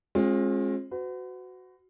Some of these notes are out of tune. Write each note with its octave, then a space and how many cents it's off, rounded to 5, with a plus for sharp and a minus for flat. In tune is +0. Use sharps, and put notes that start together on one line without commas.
G#3 +0 C4 +45 F4 +25
F#4 +0 B4 +45